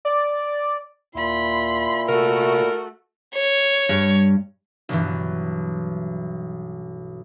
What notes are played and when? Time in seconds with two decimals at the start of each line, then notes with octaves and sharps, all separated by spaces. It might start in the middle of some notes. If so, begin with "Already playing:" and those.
0.05 D5
1.15 D#2 A#2 E4 B5 C6
2.09 C3 A3 F#4 A#4
3.35 C#5
3.89 G2
4.89 B1 G2 E3